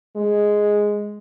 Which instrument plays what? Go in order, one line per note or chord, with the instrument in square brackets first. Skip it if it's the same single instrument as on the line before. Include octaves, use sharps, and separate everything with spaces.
[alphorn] G#3